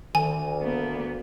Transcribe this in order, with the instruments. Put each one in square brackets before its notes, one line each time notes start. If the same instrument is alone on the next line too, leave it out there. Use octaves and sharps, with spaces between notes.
[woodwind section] D2 [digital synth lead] D#3 [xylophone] G#5
[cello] A#3 B3